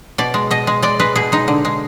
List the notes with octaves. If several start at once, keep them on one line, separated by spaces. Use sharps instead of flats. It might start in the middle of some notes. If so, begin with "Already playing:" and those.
B2 D5
G#3
B2 D#5
G#3
G#3 D5
G#3 B4
B2 G#4
G#3 D#4
D3
G#3